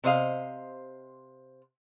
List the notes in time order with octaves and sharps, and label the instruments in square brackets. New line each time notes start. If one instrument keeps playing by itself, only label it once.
[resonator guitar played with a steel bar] C3 C5 D#5 F5